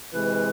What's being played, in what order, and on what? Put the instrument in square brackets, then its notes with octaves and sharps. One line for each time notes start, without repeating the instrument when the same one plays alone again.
[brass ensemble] C3 E3 G#3 [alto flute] B4